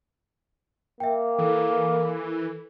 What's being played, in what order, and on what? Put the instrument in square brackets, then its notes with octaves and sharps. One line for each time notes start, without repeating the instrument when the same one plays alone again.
[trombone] A#3 [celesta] E5 G5
[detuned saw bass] E3 [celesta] A4 A#4